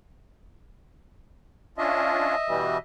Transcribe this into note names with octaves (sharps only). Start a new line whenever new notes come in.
C#4 D4 F4 D#5 E5
B2 E3 G3